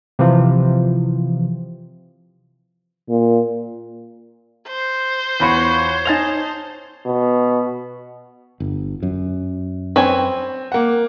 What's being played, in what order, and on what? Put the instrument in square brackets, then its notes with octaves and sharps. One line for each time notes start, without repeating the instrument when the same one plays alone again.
[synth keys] C3 E3 F3
[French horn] A#2
[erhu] C5
[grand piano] E2 B5 C#6 [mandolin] B3 F4 F#4 [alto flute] C#5
[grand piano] D#4 G#5 F7 [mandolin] D#5 F5 A5
[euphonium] B2
[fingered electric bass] G1
F#2
[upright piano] C4 [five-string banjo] B4 C#5 G#5
[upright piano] A#3 F#5